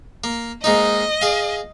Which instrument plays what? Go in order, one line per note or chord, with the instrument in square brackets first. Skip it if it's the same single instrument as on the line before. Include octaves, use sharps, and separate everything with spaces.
[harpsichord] A#3
[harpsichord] G#2 A#3 D#4 [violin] D#5
[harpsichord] G#4 F5